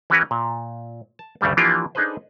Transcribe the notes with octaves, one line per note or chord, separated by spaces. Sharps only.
E3 C#4 E4 F#4 A#4 B4
A#2
A5
D2 G2 C#3 G3 A3
E3 F3 A#3 D4 F4 G4
D4 D#4 G#4 A4 B4 C5